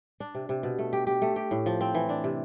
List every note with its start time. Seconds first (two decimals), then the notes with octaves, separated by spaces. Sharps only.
0.20 D4
0.35 C3
0.49 C3
0.63 B2
0.79 A3
0.93 G4
1.07 G4
1.22 A3
1.36 G4
1.51 A2
1.66 F3
1.81 C4
1.94 E3
2.09 D4
2.24 C3